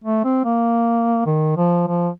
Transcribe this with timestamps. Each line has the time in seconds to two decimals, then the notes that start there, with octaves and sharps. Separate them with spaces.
0.04 A3
0.24 C4
0.45 A#3
1.26 D#3
1.57 F3
1.87 F3